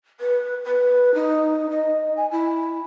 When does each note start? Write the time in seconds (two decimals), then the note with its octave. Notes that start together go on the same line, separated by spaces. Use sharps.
0.20 B4
0.64 B4
1.14 D#4
1.70 D#5
2.17 G#5
2.31 E4